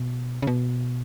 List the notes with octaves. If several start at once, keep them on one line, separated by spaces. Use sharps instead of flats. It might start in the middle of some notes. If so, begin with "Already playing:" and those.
Already playing: B2
C#3
B2